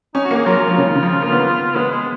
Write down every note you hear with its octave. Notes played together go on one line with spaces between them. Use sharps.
C#4 D#4
F#4
A#3
G#4
F#3 F4
F#3
F3
C#3
D#3
C#3
F3
A#3
B3
G#3 B3
G#3